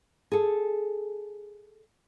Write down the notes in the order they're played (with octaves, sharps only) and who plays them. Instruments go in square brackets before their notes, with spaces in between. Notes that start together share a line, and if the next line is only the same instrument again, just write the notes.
[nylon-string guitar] G#4 A4